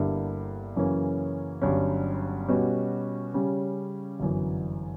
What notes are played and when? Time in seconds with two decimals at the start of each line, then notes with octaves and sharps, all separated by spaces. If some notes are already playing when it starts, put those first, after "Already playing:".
Already playing: G1 G2 D3 A#3 E4
0.76 F#2 C#3 E3 A#3 C#4
1.62 G1 G2 F#3 C#4
2.48 B2 G3 C#4 F#4 B4
3.34 C#3 G3 C#4
4.20 G1 F#2 E3